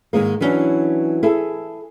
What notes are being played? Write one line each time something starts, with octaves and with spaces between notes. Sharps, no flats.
G#2 D#3 G#3 A#3
E3 F#3 C#4 D4
E4 G#4 A4